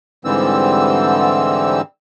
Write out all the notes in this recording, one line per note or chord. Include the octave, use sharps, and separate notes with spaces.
G#2 D3 E3 G3 C4 E6